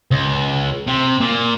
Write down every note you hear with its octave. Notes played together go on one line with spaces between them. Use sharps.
C#2
C3
A#2